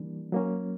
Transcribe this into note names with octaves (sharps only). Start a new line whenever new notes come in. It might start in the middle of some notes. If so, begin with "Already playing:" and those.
Already playing: E3 G3 A#3 D4
F#3 A#3 C#4